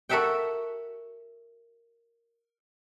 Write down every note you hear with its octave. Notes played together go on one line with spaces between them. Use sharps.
F#4 A4 A#4 E5 F#5 G5